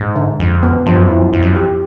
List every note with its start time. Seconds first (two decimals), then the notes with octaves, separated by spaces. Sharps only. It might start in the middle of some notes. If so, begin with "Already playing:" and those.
Already playing: G#2
0.16 D3
0.39 F2 G#3
0.63 B3
0.86 G2 F3
0.97 F#2
1.07 F2 E4
1.19 F#2
1.33 F2 E4
1.42 F#2
1.53 F2
1.56 G4